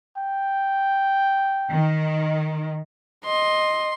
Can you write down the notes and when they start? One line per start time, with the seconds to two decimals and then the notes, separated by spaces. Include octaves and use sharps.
0.17 G5
1.71 D#3
3.25 D#5 C6